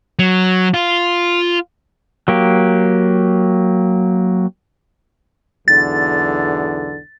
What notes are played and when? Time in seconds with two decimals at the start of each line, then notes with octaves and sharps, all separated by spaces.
0.19 F#3
0.74 F4
2.28 F#3 A#3 G4
5.68 B1 E2 D3 A6